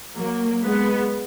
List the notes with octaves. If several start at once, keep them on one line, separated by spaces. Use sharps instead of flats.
F#3 A#3
G#3 B3